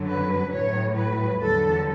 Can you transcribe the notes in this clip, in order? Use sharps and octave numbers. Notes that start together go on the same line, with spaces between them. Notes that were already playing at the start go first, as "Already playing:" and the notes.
Already playing: F#2 D3 F#3
B4
A2 F#3 C#5
B4
E2 D3 F#3 A4